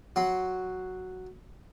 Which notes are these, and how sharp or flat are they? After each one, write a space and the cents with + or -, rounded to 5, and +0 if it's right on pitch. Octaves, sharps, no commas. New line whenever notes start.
F#3 +0 F#4 +0 C6 +0